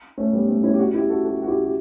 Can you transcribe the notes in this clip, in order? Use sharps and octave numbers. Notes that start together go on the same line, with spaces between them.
A3 C#4
G3 B3
A3 C#4
C#4 E4
G4
D4 F#4
E4 G4
F#4 A4
F#4 A4
F#4
E4 G4
G4